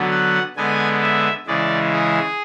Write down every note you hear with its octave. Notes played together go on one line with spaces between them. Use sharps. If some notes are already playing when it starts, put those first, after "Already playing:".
Already playing: D3 F#3 B3
F#5
D3 G#3 B3 G#5
E5
C#3 E3 G#3 D5
G#4